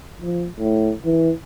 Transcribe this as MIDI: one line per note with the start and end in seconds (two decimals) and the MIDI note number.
0.21 0.47 53
0.59 0.92 45
1.05 1.31 52